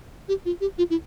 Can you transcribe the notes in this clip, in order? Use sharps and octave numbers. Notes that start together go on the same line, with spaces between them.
G4
F4
G4
F4
E4